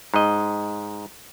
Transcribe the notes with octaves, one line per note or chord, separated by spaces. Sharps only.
G#2 D#5